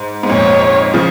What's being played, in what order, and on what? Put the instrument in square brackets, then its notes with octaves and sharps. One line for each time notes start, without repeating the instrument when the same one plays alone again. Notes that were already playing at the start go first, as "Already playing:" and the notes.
Already playing: [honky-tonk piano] G#2
G#2
[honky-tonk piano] F2 A#2 [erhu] C#5
[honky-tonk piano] C#3 F3